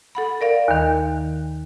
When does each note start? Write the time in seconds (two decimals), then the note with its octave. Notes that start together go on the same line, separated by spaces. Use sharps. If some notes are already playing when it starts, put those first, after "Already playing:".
0.15 A4 F#5 B5
0.41 A#4 D5 F5
0.68 D#2 D#3